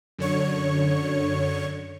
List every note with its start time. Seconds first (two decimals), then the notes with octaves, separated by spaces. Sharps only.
0.18 F#2 D3 C#5 C#6